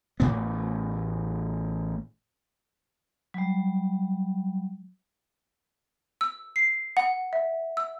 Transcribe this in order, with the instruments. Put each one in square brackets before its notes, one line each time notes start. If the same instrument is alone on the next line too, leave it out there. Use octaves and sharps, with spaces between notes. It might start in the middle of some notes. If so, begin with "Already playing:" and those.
[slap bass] A1 A2 B3
[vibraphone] F#3 G3
[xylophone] E6
C7
F#5
E5
E6